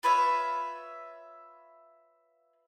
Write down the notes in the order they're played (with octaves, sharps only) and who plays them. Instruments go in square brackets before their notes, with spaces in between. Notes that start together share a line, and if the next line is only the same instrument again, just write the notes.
[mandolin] F4 B4 C#5 E5